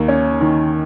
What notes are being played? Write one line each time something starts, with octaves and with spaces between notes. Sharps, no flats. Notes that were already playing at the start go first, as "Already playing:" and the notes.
Already playing: D#2 D#3 A#3
C#4
D#3